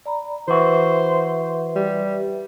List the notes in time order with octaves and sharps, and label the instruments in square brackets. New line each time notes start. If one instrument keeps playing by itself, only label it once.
[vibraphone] D5 A#5 B5
[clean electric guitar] E3 F#4 [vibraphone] B4 E5 [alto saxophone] C5
[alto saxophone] G3